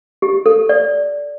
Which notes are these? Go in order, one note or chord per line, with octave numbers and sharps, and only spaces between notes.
G4
A4
D5